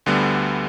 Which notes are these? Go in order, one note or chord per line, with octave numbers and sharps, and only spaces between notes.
D2 D3 G3 B3